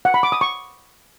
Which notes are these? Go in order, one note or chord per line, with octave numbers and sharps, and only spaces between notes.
F#5
B5
D6
D#6
C#6